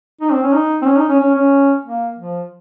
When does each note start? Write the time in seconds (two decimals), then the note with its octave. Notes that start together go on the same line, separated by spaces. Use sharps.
0.21 D#4
0.32 C4
0.43 C#4
0.54 D#4
0.82 C4
0.87 C#4
0.97 D#4
1.09 C#4
1.20 C#4
1.36 C#4
1.85 A#3
2.18 F3